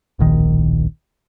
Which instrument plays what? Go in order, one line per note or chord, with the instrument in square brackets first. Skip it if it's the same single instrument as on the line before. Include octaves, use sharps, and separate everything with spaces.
[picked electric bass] D1 A#1 D#3